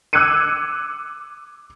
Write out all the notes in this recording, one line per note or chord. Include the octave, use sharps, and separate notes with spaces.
D6 E6 F#6 G#6 C#7 D#7